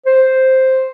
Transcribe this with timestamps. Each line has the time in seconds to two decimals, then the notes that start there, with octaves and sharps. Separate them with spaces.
0.06 C5